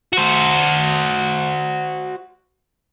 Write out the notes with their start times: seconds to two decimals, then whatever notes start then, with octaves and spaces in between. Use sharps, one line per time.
0.13 F#4 C5